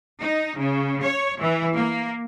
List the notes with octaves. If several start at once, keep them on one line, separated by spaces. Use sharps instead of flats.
D#4
C#3
C#5
E3
A#3